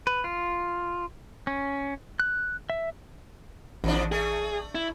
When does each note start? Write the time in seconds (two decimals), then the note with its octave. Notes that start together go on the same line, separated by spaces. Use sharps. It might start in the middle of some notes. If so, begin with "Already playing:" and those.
0.07 B4
0.24 F4
1.47 C#4
2.20 F#6
2.70 E5
3.84 A1 D#2 F3 D4
4.12 A3 G#4
4.75 E4